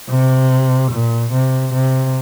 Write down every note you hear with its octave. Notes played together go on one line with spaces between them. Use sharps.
C3
A#2
C3
C3